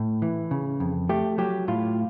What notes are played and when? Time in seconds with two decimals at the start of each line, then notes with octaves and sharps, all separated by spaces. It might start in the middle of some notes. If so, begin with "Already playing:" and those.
Already playing: A2
0.22 E3
0.51 C#3
0.80 F2
1.09 A3 G4
1.38 F#3 G4
1.68 A2 F4